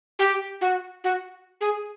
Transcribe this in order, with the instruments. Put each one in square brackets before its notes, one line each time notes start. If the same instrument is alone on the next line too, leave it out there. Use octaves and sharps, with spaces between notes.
[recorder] G4
F#4
F#4
G#4